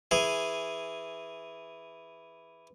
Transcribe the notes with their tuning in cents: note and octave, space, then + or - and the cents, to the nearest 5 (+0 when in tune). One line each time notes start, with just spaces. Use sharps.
E3 +0 G#4 -5